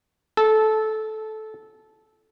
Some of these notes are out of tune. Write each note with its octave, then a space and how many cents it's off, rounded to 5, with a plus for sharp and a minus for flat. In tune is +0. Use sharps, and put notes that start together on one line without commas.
A4 -15